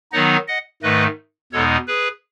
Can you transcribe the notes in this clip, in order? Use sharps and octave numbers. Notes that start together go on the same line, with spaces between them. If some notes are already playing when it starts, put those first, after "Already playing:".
D#3 F#3 B3 D#4 D#5 F#5
D#5 F#5
G#2 D#3 A3 B4 D#5
E2 B2 G#3 B3 D#4 A4 C#5
G#4 B4